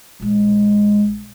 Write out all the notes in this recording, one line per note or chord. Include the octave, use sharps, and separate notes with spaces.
A#1 G#3